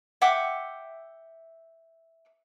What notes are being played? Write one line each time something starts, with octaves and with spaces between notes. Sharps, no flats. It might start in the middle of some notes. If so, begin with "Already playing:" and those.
E5 F#5 G5 D6